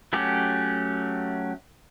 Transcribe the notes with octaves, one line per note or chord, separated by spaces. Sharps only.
F#3 A3 C#4 G4 D6